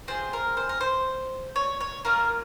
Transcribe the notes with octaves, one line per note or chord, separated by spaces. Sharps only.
C4 F4 G#4 C5
A#4
C5
A#4
C5
C#5
C#5
A#3 C#4 F4 A#4